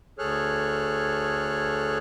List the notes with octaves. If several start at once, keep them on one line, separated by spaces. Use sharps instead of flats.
D2 G#4 A4 C#5 F6 F#6